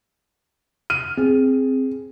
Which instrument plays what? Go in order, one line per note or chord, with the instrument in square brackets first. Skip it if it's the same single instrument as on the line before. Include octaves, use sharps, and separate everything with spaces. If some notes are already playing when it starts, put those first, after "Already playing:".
[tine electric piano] F6 [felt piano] D#7
[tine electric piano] C4 [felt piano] G#4